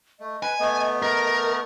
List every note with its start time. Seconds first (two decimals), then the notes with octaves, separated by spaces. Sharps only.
0.20 A3 D#5
0.43 B4 G#5
0.60 A3 B3
1.03 A#4